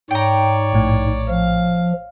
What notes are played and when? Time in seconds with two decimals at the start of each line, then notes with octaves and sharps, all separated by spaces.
0.11 G#2 C#5 D5 G5 A#5
0.73 A#1 A2
1.29 F3 F5